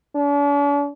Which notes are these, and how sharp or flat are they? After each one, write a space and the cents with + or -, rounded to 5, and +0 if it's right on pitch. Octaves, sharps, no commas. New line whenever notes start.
D4 -45